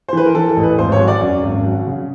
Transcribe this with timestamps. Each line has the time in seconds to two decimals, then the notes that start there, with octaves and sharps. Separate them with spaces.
0.09 C5
0.13 E3 B4
0.26 A#4
0.35 E3 A4
0.49 A4
0.57 A1
0.63 B4
0.78 G#1 C5
0.92 C#5
1.00 F#3
1.08 D5
1.21 F#2
1.43 G#1
1.64 F#3
1.87 C#3